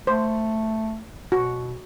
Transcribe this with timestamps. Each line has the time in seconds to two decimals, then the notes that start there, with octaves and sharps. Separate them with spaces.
0.07 A3 C5
1.32 B2 F#4